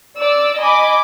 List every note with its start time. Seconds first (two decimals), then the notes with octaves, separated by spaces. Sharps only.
0.19 D5 E6
0.60 D#5 G#5 B5 D6